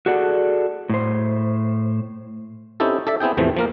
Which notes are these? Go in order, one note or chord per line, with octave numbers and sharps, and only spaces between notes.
F#4 G#4 A4 D5 F#5
A2 C5
C4 C#4 D#4 E4 G4 A4
A4 D5 E5 A5
B3 C4 E4 G#4 G5
E2 A2 C3 E3 F3 A3
F3 A#3 A#4